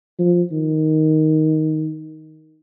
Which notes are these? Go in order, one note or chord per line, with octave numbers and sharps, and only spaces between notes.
F3
D#3